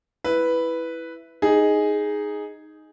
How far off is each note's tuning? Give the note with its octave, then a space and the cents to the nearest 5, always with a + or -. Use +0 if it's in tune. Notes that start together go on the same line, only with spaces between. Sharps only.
E4 +0 B4 +0
D#4 +0 G#4 +0